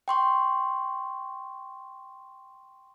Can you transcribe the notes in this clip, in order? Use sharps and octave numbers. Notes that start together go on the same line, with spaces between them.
G5 C6 C#6